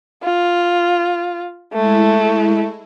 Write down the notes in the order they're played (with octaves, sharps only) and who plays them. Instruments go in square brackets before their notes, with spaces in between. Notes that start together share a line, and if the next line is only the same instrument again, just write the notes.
[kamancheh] F4
[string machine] G#3 E4 [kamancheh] A3